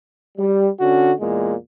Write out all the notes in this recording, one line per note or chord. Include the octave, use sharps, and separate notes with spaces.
G3
D3 C#4 F#4
E2 A#2 G#3